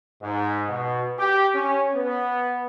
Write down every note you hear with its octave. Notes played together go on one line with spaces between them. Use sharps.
G#2
B2
G4
C#4
B3